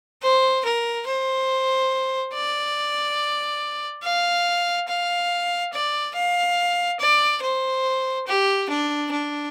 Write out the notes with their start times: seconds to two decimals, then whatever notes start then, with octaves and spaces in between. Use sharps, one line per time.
0.22 C5
0.65 A#4
1.07 C5
2.34 D5
4.03 F5
4.88 F5
5.73 D5
6.15 F5
7.00 D5
7.42 C5
8.27 G4
8.69 D4
9.11 D4